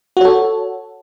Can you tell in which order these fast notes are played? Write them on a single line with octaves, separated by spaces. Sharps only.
F#4 C#5 A4